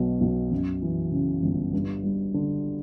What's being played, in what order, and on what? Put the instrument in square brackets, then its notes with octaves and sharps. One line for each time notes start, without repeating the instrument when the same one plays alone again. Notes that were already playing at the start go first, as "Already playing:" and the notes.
Already playing: [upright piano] B1 B2 F#3
B1
F#2
E3
C#3
G1
G2
G3
D3